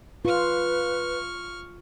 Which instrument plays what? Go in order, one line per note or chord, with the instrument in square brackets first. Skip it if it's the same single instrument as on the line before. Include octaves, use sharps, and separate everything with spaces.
[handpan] F4 [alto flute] B4 [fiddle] C#6 F6